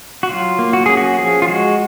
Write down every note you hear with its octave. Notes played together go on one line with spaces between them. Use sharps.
F#4
F#3 F4
A#3
F#4
C#4 G#4
F#4
F3 G#4
F4
G#3 F#4